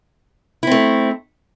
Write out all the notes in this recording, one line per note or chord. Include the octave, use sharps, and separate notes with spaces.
A3 C4 E4